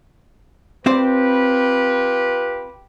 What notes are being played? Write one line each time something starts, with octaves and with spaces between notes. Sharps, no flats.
C4 F4 G4 B4 C5 D5